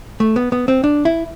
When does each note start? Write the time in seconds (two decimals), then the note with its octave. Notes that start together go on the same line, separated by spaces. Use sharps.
0.20 A3
0.36 B3
0.52 B3
0.68 C4
0.84 D4
1.05 E4